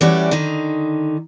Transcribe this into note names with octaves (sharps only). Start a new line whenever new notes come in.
E3 G3 A3 C#4 F#4 D5
D3 D#3 D#4